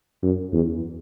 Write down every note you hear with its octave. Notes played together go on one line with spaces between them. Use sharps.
F#2
E2